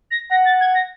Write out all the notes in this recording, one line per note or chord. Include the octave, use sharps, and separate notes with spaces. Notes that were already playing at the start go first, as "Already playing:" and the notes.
A#6
F#5 A#6
A6
G#6
A#6